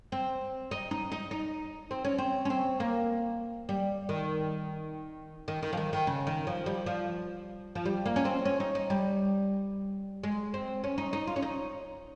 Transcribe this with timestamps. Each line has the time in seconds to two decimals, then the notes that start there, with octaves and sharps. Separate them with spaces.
0.12 C4
0.71 D#4
0.91 D#4
1.12 D#4
1.31 D#4
1.91 C4
2.05 C#4
2.18 C4
2.45 C#4
2.50 C4
2.80 A#3
3.69 G3
4.09 D#3
5.48 D#3
5.63 D#3
5.73 F3
5.77 D#3
5.93 D#3
6.07 C#3
6.27 D#3
6.47 F3
6.66 G3
6.86 F3
7.75 F3
7.85 G3
8.06 A#3
8.16 C#4
8.25 C4
8.45 C#4
8.60 D#4
8.75 D#4
8.90 G3
10.23 G#3
10.54 C4
10.84 C#4
10.98 D#4
11.13 D#4
11.27 F4
11.36 C#4
11.42 D#4